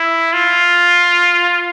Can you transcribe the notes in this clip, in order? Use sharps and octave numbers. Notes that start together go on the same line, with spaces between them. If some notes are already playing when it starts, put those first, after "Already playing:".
Already playing: E4
F4